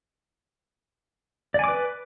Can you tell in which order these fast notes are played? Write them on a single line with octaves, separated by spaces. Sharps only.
D5 G#5 D6 B4